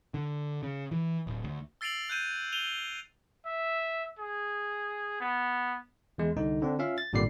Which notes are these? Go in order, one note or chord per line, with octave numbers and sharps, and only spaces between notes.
D3
C#3
E3
D1
D2
E6 A6 C7 D7 F7 F#7
F#6 G6 D#7
D#7 F7 G7
E5
G#4
B3
E2 G#3
C2 D3 D#4
D3 C4 D4
C#4 F4 E5 F5
A6
G#1 A#2 D3 G3 D5 C7